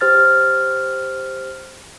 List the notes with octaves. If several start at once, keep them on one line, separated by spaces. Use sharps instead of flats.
G4 C5 F6 A6